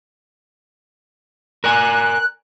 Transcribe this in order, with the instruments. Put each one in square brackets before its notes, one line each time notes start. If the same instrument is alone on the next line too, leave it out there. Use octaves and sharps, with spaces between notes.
[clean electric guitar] A#4 D5 G#5 [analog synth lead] F#6